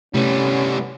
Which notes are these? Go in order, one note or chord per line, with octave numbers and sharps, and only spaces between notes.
C3 G3 A3 B3 C#4 E4